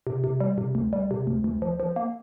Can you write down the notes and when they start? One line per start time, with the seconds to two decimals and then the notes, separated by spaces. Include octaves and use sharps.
0.07 C3
0.24 C3
0.40 G3
0.58 C3
0.75 D2
0.93 G3
1.11 C3
1.27 D2
1.44 D2
1.62 F3
1.80 F3
1.96 A#3